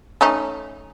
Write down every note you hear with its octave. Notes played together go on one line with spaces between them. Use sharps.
A3 C#4 D#4